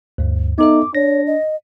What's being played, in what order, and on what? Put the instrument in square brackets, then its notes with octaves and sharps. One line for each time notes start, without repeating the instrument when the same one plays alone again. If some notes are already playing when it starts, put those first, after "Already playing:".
[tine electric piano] D2 G2
[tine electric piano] B3 A4 E5 [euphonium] D#4 [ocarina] D6
[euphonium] D4 [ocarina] C#5 [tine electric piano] A#6
[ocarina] D#5